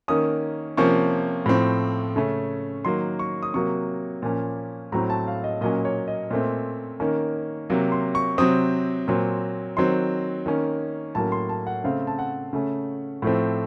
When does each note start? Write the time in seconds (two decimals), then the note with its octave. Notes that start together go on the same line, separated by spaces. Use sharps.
0.08 D#3 A#3 C#4 D#6
0.77 C3 F3 A#3 C#4 C#6
1.46 A2 F3 C4
2.16 C#3 A3 C#4
2.85 D#3 F#3 A#3 C6
3.19 C#6
3.43 D#6
3.54 C3 F#3 A#3 C#6
4.22 A#2 F3 A#3 C#4
4.92 A2 F#3 C4 A#5
5.10 A5
5.27 F5
5.44 D#5
5.61 A#2 F#3 A#3 C#4 D#5
5.85 C#5
6.08 D#5
6.31 A#2 A3 C4
7.00 D#3 A#3 C#4
7.70 C3 F#3 A#3
7.92 C6
8.15 C#6
8.38 C3 F#3 C4 D#6
9.08 A#2 F#3 C4
9.77 D#3 F#3 C4 C6
10.46 D#3 A#3 C#4
11.15 A2 F#3 A#3 C#4 A5
11.32 C6
11.49 A5
11.67 F#5
11.84 C#3 A3 C4 F5
12.07 A5
12.19 F#5
12.53 C#3 A3 C#4
13.22 A2 F3 A3 C4